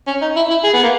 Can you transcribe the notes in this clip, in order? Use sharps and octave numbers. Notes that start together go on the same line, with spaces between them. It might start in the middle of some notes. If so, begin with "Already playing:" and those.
C#4
D#4
E4
E4
G#4
B3
A#3